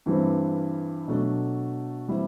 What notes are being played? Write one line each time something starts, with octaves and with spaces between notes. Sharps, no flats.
G2 E3 G3 C4
B2 F#3 A3 D4
E3 G3 C4 E4